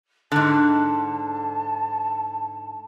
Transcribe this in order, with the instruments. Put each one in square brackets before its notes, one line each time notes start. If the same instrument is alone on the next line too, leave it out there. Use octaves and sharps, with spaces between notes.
[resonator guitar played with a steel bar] G#2 D3 [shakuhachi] A5